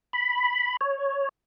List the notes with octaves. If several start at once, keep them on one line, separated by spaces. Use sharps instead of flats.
B5
C#5